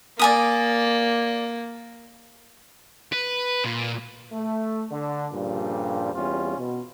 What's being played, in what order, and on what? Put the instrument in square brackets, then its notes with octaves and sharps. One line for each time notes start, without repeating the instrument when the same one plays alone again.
[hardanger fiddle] A#3 [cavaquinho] D5 G#5 D#6
[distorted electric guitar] B4
A#2
[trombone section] A3
D3 D4
G2 A#2 C#3 F3 G3
E2 G3 C4 C#4 F4
B2